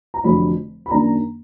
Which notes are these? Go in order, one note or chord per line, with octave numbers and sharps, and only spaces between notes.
A#5
F1 F2 D3 F#3 D4 B5
B5
F#2 D#3 A#3 D4 A#5